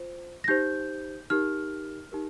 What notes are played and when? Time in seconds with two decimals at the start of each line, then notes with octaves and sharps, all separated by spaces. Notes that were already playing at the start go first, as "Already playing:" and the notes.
Already playing: F4 C5
0.44 A#6
0.48 D#4 G4 C5 G6
1.30 D#4 G4 A#4 F6
2.12 D#4 G4 A#4